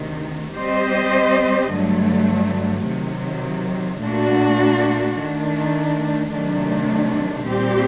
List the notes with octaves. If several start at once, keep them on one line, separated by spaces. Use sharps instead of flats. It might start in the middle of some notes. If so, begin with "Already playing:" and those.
Already playing: D2 C3 D#3
G3 C4 G4 C5 D#5
G2 D3 F#3 A3
C3 D#3 F#3
A#2 A3 D4 F#4
D#3 A3 D4
C3 D#3 F#3 A3 D4
A#2 G3 C4 G4